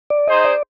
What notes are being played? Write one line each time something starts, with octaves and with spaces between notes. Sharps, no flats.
D5
D#4 G#4 C5 D#5
D5